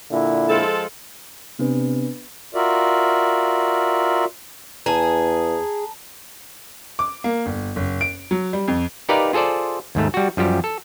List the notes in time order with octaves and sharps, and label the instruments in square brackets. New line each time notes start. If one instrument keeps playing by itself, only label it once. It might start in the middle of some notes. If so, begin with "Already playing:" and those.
[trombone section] A#2 D3 E4
[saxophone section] F3 G#3 A4
[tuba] C3 [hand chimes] B3 D4 B4
[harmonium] F4 F#4 A#4 D5 E5
[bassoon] E2 [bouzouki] G#4 [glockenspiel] A5 A#5
[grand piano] D6
A#3
G1
F#1
D7
F#3
G3
F2
[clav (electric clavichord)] D#4 G4 A#4 B4 D5 F5
F4 G#4 A4 C5 D5
D#2 G#2 A3
G3 F#4
F#2 F3 G3 G4
A4